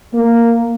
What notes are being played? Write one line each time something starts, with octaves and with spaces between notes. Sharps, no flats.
A#3